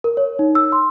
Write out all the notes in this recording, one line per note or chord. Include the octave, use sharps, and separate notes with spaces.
A#4
C#5
D#4
E6
C6